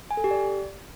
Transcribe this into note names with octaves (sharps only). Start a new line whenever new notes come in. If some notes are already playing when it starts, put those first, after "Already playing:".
G#5
A4
G4
D5